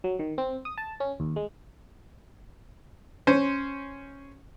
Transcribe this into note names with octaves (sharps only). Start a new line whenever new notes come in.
F#3
D#3
C4
D#6
A5
C#4
D#2
G#3
C#4 C5